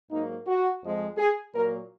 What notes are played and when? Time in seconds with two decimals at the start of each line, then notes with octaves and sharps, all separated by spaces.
0.11 G#2 F#3 A#3 D#4
0.47 F#4
0.83 F2 F3 G#3
1.18 G#4
1.53 A#2 F#3 A#3 A#4